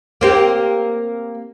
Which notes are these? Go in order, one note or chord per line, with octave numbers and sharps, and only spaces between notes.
A#3 C4 G4